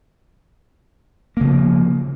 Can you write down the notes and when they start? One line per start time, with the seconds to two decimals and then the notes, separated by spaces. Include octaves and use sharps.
1.37 A#3
1.41 C#3
1.45 F3